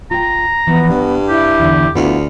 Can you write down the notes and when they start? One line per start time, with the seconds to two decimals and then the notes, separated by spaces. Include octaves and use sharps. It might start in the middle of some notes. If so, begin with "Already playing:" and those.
0.11 F4 G5 A#5
0.67 E3 F3 B3
0.90 G2 D4
1.29 E4 G4
1.60 E2 D3
1.96 D2 B3 E4 F4